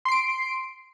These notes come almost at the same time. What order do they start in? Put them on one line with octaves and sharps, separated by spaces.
C6 C7 D7